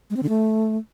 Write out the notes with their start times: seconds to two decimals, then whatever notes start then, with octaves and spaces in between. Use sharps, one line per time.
0.10 G#3
0.16 C4
0.23 D3
0.29 A3